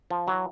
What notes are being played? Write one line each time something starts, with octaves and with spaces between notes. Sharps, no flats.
F3
E3 F#3